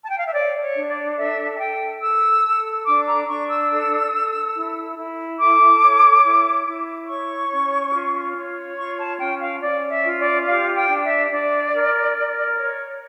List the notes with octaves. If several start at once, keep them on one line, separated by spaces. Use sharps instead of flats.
A5
G5
F5
E5
C#5 D5
C#5
D4
D5
A4 E5
A5
A4 G5
A4 E6
A4
D4 D6
A#5
D4 C#6
E6
A4
A4
E4
E4
A4 D6
C#5
E4
E4
C#5 C#6
C#4
F4
C#5
F4 C#6
A5
C#4 G5
F5
C#4 D5
E5
F4
D5
G4 F5
G5
D4
E5
D4 D5
A#4
A#4
C#5